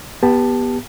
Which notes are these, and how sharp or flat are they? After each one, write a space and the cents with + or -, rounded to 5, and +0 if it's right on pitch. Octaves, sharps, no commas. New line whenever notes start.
B3 -20 G4 +15 A5 +0